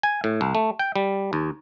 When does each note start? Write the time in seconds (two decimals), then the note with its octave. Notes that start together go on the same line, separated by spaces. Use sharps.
0.03 G#5
0.24 A2
0.41 C2
0.55 A3
0.79 G5
0.96 G3
1.33 D#2